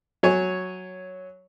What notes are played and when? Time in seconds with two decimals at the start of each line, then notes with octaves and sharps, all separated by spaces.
0.23 F#3 C#5 G#5